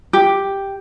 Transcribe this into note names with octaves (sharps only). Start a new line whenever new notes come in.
G4